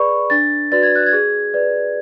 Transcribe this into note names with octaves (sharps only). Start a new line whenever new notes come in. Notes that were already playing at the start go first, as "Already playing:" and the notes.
Already playing: G#4 B4 D5 B5 C#6
D4 A6
F#4 B4 D5 A6
G#6
F#6
G#6
G#4
B4 D5